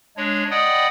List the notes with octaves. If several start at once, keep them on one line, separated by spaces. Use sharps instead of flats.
G#3 D4 C#5
D5 D#5 F#5 G5 B5 D#6